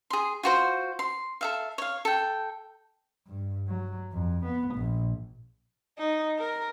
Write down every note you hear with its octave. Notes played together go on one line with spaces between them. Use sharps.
G#4 C6
F4 F#4 C5
C6
A4 E5 F5
C#5 F5
A4 G5
G2
F#3
F2
B3
A#1
D#4
A#4